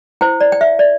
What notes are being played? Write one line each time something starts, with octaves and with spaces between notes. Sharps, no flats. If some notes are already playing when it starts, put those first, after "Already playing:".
E4 C5 G5
D5
G5
E5
D5